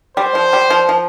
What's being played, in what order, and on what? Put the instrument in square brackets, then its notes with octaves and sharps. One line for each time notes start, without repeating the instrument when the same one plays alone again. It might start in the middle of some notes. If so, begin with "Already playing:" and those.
[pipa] G3 [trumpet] C5
[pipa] F3
G3
F3
F3